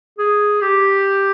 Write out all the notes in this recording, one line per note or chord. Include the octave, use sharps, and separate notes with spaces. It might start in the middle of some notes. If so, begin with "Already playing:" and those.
G#4
G4